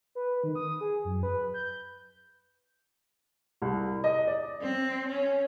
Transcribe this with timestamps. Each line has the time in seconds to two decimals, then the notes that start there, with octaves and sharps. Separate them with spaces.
0.15 B4
0.44 D#3
0.55 D#6
0.81 G#4
1.05 F#2
1.23 B4
1.54 G6
3.62 C2
4.04 D#5
4.27 D5
4.61 C4
5.07 C#4